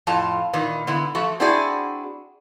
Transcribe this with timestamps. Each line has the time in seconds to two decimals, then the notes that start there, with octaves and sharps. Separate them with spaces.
0.07 F2 A2 F4 A5
0.53 A#2 D#3 E3
0.87 D3 B3 E4
1.15 F3 A3 F#4
1.40 C4 D4 E4 F#4 G#4 D5